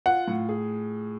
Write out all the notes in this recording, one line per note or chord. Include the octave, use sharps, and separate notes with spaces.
F4 F#5
A2
G#4